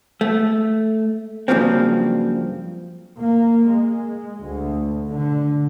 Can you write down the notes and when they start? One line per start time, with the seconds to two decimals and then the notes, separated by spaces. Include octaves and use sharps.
0.21 A3
1.48 G2 C#3 F3 F#3 A#3 C4
3.20 A#3
3.68 G#3
4.42 D2
5.10 D3